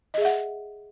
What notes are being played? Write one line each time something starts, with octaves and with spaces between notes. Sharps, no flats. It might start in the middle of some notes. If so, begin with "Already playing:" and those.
G#4 D#5 E5 F#5